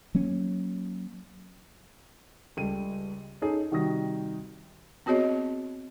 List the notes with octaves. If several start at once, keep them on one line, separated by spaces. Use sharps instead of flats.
F#3 A#3 C#4
C#2 G3 A4 D#7
C#4 D#4 G#4 A4
C3 D#3 G3 F#4 D#6 A#6
B3 C4 F#4 G#4 C#5 D#5